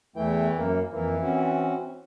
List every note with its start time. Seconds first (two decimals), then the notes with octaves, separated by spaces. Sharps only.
0.16 E2 E3 A3 G5
0.57 F#2 A#3
0.93 F2 E3 A#3
1.22 C4 C#4 F#4